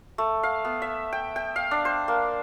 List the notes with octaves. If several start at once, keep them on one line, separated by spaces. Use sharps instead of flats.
A3
F5
B3
E5
G5
G5
F5
D4
C5
A#3